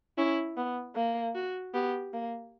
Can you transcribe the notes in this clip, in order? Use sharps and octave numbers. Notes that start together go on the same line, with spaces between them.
C#4 E4
B3
A#3
F#4
B3 G4
A#3